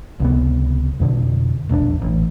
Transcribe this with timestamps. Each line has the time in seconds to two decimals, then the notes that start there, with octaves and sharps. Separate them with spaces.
0.20 C#2 C3 B3
1.00 F2 B2 D3
1.69 E1 A#1 C#4 D4
2.02 A1